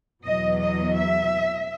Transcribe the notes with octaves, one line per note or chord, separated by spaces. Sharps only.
E2 B2 F#3 D#5
D#5
E5